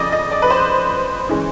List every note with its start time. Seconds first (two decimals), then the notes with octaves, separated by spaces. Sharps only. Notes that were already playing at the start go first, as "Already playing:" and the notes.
Already playing: F2 C#3 F3 A3 D5 D#5
0.12 D#5
0.31 D5
0.42 B4
0.50 C5
1.29 E3 G#3 C#4